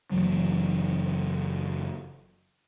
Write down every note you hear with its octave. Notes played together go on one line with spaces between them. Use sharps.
F#1 E3 F#3